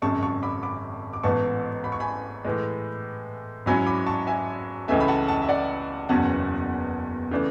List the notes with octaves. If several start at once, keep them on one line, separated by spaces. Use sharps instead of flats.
G#1 F#2 C#3 G#3 A5 C#6
A5 C#6
B5 D6
B5 D6
D6
A1 G#2 E3 B3 A5 C#6
B5
C#6
G#5 B5
A2 E3 G#3
G#2 F#3 C#4 E4 G#5 B5
B5 D6
A5 C#6
E5 G#5
C#2 C#3 E3 A3 C#4 E5 G#5
B5
F#5 A5
F#5 A5
E5
D5 F#5
F#1 E2 B2 F#3 C#4 F#5 A5
C#3 E3 A3 D4